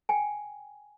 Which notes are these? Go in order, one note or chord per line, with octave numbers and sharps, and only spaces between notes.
G5 G#5